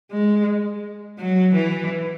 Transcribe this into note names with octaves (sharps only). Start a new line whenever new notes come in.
G#3
F#3
E3